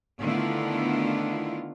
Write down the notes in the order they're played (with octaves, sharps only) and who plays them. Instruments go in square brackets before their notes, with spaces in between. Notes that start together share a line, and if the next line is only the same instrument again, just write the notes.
[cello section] D3 D#3 A3 B3 E4 F4